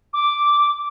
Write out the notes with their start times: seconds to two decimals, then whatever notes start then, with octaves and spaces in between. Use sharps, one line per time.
0.13 D6